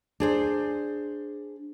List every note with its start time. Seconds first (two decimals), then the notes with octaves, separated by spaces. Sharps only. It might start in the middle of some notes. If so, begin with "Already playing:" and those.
0.20 D4 G#4 C5